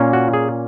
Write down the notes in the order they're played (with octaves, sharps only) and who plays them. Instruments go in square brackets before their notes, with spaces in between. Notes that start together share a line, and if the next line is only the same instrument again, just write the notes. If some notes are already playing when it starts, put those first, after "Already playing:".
Already playing: [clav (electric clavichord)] A#2 A#3 C#4
F#4
G#4